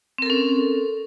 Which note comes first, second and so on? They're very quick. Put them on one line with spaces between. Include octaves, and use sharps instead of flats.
C4 A#4 A4 C#4